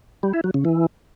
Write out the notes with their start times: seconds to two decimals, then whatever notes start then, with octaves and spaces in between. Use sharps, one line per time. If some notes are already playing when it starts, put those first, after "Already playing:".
0.23 G3
0.34 E4
0.44 F#3
0.54 C#3
0.65 E3